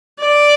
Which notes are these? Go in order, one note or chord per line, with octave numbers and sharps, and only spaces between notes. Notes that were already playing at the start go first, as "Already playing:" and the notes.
D5